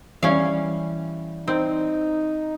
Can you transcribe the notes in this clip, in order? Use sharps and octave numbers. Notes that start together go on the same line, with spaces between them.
E3 G3 C#4 F5
C4 D#4